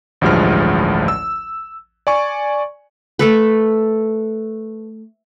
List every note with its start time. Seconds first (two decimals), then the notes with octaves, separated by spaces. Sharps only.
0.21 A1 D2 G2 F3 G#3 F6
1.08 E6
2.07 D5 G#5 C#6
3.19 A3 A4 B4